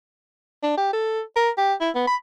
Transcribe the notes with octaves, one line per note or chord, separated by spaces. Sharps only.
D4
G4
A4
A#4
G4
E4
B3
B5